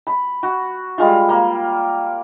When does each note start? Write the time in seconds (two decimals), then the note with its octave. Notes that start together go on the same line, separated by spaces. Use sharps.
0.07 B5
0.43 F#4
0.98 G3 G#3 F4
1.29 A#3